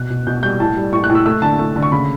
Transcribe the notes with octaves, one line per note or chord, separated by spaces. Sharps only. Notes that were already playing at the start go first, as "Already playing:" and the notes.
Already playing: B2 F#6
B2
B2 G6
G3 G6
A2 A5
G3
A2 C#6
F#6
A2
E6
A3 E6
D3 A5
A3
D3
C#6
C#3 B5